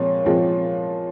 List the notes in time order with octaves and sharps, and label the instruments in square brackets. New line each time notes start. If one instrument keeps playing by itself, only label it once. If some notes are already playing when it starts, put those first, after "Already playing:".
Already playing: [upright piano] A#2 F3 G#3 C4 [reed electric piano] C#5
[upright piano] A#2 F3 G#3 C4